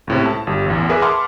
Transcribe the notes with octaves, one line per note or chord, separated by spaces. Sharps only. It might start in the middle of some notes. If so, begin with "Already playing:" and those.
C#2 A2 C3
A5
G1 G4
A1 E2
G#4 A#4 B4 E5 D6
F#5 A5 B5 C6 D6 F6